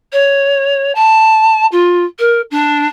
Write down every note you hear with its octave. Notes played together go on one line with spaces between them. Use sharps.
C#5
A5
F4
A#4
D4